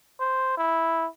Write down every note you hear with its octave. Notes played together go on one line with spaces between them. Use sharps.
C5
E4